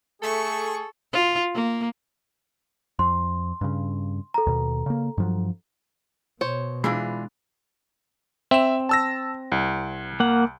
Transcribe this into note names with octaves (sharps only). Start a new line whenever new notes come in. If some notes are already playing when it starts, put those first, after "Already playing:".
A3 G#4 A4 C#6
F4
A#3
F2 C6
G2 C#3
A4 A#5
D#2 B2
C#3 A#3
G2 F3 F#3
B2 C5 C#5
E3 G#3 D4 F4 G#4 B5
C4 E5 E7
A5 E6 A#6
C2
A#3 F#5